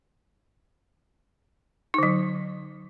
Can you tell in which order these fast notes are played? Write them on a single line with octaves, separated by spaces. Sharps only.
D#4 D3 F#3